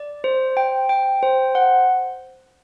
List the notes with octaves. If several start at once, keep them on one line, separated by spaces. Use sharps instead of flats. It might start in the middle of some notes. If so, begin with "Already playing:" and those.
Already playing: D5
C5
G5
G5
C5
F#5